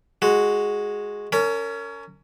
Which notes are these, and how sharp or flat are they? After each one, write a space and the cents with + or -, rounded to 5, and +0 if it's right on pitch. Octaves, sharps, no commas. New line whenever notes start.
G#3 +0 F#4 -5
C#4 +25 A#4 -25